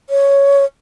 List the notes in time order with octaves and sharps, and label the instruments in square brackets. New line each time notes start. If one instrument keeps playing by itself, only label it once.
[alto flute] C#5